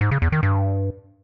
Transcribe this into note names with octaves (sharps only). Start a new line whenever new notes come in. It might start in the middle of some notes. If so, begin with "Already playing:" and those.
G#2
C#3
E2
D#3
G2